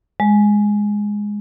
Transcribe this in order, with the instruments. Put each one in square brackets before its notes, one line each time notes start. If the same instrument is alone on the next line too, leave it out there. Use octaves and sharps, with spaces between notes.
[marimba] G#3